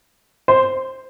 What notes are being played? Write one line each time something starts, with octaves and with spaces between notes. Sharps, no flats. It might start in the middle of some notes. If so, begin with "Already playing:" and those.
C5